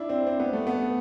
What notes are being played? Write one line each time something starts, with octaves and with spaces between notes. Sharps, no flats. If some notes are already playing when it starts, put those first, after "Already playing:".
Already playing: D4 E4
C4
C4
B3
A3
B3